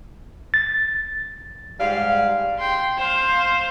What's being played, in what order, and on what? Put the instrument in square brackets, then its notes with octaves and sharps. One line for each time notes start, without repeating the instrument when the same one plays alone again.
[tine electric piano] A6
[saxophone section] G#2 G3 F5
[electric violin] G5 C6
C5 F5